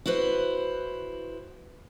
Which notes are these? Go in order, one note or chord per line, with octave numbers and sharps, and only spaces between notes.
E4 F#4 B4 C5